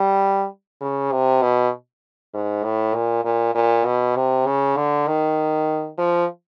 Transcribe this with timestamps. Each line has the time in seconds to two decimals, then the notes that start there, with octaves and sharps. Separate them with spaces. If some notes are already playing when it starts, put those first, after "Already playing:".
Already playing: G3
0.81 C#3
1.12 C3
1.42 B2
2.34 G#2
2.64 A2
2.95 A#2
3.25 A#2
3.55 A#2
3.85 B2
4.16 C3
4.46 C#3
4.77 D3
5.07 D#3
5.98 F3